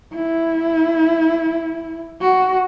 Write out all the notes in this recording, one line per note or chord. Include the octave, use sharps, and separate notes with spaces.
E4
F#4